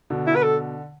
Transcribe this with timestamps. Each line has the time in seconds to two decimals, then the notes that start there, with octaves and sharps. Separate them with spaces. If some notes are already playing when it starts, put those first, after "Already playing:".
0.10 B2 D3
0.27 E4
0.35 B4
0.43 A4